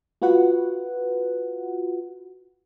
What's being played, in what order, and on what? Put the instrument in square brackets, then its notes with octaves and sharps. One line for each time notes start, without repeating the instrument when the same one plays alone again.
[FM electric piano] F4 F#4 B4 F#5